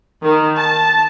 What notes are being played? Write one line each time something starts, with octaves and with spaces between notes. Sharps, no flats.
D#3
A5